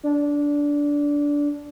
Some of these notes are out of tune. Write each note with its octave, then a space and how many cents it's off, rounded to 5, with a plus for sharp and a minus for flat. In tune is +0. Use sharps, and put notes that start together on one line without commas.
D4 -15